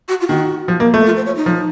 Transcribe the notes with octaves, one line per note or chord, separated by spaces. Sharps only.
F#4
F4
D#3 F#4
F3
A#3
A3
F4
C5
C#5
D#4
F3